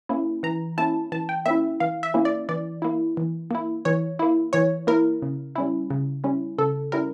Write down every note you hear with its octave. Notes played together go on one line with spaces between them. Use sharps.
A#3 C#4 E4
E3 A#5
A#3 C#4 E4 A5
E3 A5
G5
A#3 C#4 E4 E5
E3 F5
E5
A#3 C#4 E4
D5
E3 D5
A#3 E4
E3
A#3 E4
E3 C#5
A#3 E4
E3 C#5
A#3 E4 A#4
C#3
G3 C#4 E4
C#3
G3 C#4 E4
C#3 A4
G3 C#4 E4 A#4